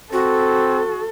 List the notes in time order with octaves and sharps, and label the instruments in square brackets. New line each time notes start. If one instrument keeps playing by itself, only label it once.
[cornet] C4 [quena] F#4 [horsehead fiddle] A4